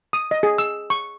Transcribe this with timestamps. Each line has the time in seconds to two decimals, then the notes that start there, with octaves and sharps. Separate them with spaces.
0.13 D#6
0.31 D#5
0.43 G#4
0.58 E6
0.90 C#6